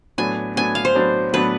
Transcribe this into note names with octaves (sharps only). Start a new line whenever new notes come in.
A2 F#3 B3 D4 G#5
A2 F#3 B3 D4 G#5
F5
C5
A2 F#3 B3 D4
A2 F#3 B3 D4 B4